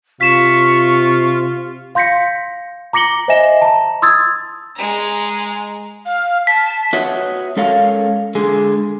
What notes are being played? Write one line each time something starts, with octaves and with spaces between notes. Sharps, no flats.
C3 F4 C#6 B6 E7
F5 C6 G6 A#6 B6 C#7
A#5 D6 A#6 C#7 F#7 G7
C5 D#5 E5 G#5 A#6 E7
A5 A#5
C6 D#6 E6 G#6 A6
G#3 A#5
F5
A5 B6
F#4 B4 C#5 D#5 E5 F#5
G#3 C#4 A4 A#4 C#5 F5
D3 G#3 G#4